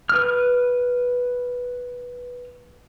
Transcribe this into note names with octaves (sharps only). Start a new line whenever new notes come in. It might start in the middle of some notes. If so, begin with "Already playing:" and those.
B4 F6